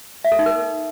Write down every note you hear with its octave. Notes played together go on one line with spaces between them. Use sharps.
E5
A4
D#4
A#4